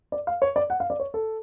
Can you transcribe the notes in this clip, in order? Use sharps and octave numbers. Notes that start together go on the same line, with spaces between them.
D5
F5
C#5
D5
F#5
F5
D5
C#5
A4